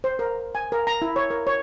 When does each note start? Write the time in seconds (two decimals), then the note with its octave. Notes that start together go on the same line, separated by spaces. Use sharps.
0.04 C5
0.19 A#4
0.55 G#5
0.72 A#4
0.87 A#5
1.02 E4
1.16 C#5
1.30 A#4
1.47 C#5